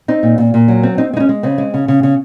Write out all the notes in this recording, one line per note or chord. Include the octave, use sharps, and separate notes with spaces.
C4 D#4
A#2
A#2
A#2
F#3
C4
C4 D#4
G#3 D#4
C#4
G#3
C#3 C4
G#3
C#3
C#3
C#3